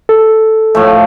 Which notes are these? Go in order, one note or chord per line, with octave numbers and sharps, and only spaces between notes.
A4
A2 F3 A3